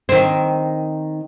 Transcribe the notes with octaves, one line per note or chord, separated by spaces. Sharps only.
D#3 C4